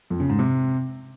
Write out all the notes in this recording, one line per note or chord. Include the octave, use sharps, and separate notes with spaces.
F2
C#3
G#2
C3